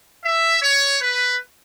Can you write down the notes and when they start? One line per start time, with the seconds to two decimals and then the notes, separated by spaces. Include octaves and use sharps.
0.24 E5
0.62 C#5
1.01 B4